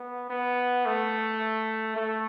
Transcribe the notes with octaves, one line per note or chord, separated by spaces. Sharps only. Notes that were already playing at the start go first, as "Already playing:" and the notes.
Already playing: B3
B3
A3
A3